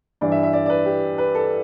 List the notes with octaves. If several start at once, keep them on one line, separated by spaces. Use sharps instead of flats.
G2 E3 D5
E5
E5
D5
D5
B4
G4
B4
A4